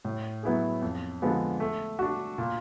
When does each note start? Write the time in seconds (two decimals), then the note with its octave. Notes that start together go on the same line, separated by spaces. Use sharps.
0.05 A2
0.43 F#3 B3 E4 G#4
0.82 F2
1.22 D3 F3 G#3 B3
1.60 A3
1.99 D4 F#4
2.38 A#2